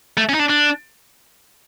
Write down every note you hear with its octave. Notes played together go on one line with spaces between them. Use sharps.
A3
C#4
D#4
D4
D4